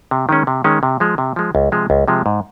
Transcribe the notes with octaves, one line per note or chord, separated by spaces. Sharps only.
C3
D#3 G#3 C#4
C3
D#3 G#3 C#4
C3
F3 G#3
C3
F3 G#3
C#2
C3 F3 G#3
C#2
C3 F3 G#3
G#2